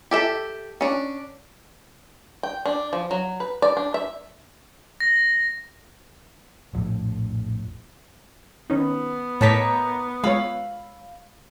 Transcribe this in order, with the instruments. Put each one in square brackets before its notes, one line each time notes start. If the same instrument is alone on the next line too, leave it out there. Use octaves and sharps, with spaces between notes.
[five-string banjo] G4 A4 E5
C#4 D4
G5
D4
F3
F#3
B4
D5
D4
E5
[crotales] A#6
[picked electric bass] A#1 F2 A2
[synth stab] D#3 C#4 D#4 [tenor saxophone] B3
[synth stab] A2 A5 B6 [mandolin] A#3 D#4 C#5
[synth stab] G#3 F4 C#5 [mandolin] F5 B5 E6